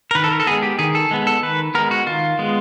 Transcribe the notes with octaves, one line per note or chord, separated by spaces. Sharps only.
A#4
D#3 B4
A4
A#4
A4
G#3 B3 G#4
G4
D#3 G#4
A4
G#3 B3
A4
D#3 B4
G#3 B3 A#4
F#4
D#3 F4
G#3 B3